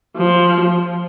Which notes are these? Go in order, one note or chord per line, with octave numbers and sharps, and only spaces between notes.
F3